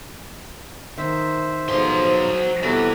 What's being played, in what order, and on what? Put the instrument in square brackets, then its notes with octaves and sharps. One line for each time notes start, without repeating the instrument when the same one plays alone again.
[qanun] D#3 [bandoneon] C5 E5
[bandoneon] G#2 B2 F3 [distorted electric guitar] F#3 C6 [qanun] G#4 A4 [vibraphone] C5
[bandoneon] C3 G3 F#4 [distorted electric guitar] E3 [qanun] B3 G4 D5 [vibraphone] A4